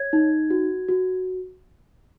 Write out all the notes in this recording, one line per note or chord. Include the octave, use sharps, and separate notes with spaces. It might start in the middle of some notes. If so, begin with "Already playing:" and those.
Already playing: C#5 G#6
D#4
F#4
F#4